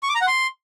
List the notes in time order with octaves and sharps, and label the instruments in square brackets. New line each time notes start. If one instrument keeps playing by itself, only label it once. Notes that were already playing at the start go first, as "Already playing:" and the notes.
[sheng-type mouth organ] C#6
D6
A#5
F#5
C6